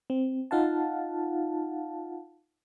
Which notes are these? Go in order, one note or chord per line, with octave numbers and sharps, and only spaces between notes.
C4
D#4 F4 F5 F#5 A5